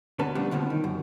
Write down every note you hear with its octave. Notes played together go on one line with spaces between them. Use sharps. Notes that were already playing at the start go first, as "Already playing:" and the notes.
D2 B2 C#4 B4 A5
F3 G3 A3 B3 D4
F2 B2 D3 F3
D#3
F#2